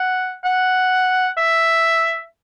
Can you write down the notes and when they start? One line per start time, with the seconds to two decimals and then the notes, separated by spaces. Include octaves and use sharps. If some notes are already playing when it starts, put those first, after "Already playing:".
Already playing: F#5
0.44 F#5
1.37 E5